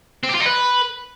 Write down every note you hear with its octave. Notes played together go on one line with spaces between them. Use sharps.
C4
G4
F4
D#4
B4